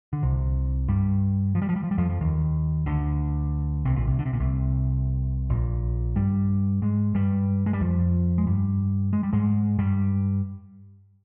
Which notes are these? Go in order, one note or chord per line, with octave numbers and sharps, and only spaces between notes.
D3
C2 C3
G2 G3
F3
G3
F3
G3
F3
G3
F2 F3
F3
D#2 D#3
D2 D3
C2 C3
A#1 A#2
C2 C3
D3
C3
A#2
C2 C3
A#1 A#2
G2 G3
G#2 G#3
G2 G3
G#3
G3
F2 F3
G#3
G2 G3
G#3
G3
G#2 G#3
G2 G3